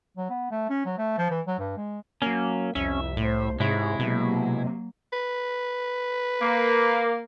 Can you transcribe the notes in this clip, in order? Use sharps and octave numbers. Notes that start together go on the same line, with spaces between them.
F#3
B3
A3
C#4
F#3
A3
F3
E3
F#3
G2
G#3
F#3 A#3 C#4
C2 F2 C#4 E5
A2 A3 C5
G#2 C3 G#3 E4 G#4 C#5
B2 F#3 A#3
B4
A#3